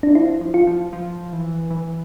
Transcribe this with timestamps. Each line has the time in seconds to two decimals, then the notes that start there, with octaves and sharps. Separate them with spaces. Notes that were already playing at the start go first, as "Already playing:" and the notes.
0.03 D4
0.15 F3 E4
0.41 F3
0.54 F4
0.67 F3
0.93 F3
1.33 E3
1.71 E3